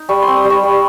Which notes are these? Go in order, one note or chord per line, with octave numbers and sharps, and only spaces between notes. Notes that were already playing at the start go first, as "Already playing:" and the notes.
Already playing: D#4
G3 C#6
C6
C4
D#6
G3
C#6
G3